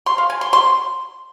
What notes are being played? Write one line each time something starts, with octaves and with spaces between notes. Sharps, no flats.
C6
F5
G#5
C6
C6